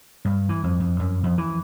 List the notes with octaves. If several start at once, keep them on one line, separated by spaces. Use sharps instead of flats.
G2
E3
F2
F2
F#2
F2
E3